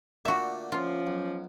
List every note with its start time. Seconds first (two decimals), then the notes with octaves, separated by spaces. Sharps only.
0.25 A#2 D3 A3 F#4 E5
0.72 F3 C#4 F4
1.07 B1